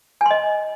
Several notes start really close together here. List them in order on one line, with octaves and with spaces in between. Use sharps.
G#5 C6 D#5